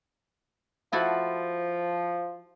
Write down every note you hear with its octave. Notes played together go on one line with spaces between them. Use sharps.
F3 E4 F#4 A4